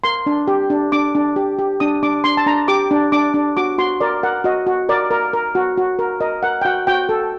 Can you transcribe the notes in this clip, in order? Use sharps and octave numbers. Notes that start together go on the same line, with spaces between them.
A#4 C6
D4
G4
D4
D4 D6
D4
G4
G4
D4 D#6
D4 D6
D4 C6
A5
D4 A#5
G4 D6
D4
D4 D6
D4
F#4 D6
F#4 C6
A#4 D5
A#4 F#5
F#4 D#5
F#4
A#4 D5
A#4
A#4
F#4
F#4
A#4
A#4 D#5
A#4 F#5
G5
F#4 F#5
F#4 G5
A4